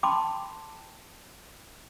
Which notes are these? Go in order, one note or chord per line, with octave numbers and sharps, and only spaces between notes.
G5 A5 B5 C6 D6